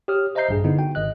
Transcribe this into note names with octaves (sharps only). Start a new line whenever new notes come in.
G4 C#5 D#6 F6
C5 D#5 E5 A#5 G6 C7
A#1 G2 G#4
D3 B3 D#4 E4
F#4 G5
G#1 D#5 F#6